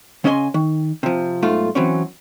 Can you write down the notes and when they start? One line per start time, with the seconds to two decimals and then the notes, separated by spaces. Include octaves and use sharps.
0.24 C#3 C#4 D#5 E5 G#5 C6
0.54 D#3
1.03 C3 F3
1.42 B1 G#2 A3 F4
1.75 E3 F#3 C4 C#4